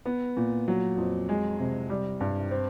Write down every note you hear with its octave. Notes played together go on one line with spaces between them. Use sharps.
B3
A#2
F#3
F2
G#3
C3
G3
G2
C4